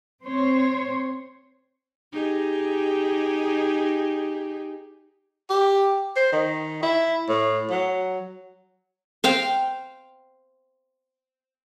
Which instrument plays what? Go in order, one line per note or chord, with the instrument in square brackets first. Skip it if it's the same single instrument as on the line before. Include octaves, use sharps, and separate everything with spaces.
[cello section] C4 C5 C#5
[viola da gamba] D#4 G4 G#4
[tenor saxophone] G4
C5
D#3
E4
A2
F#3
[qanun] C5 F5 G5